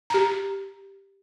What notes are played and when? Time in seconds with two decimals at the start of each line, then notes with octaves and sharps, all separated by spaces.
0.10 G4 A#5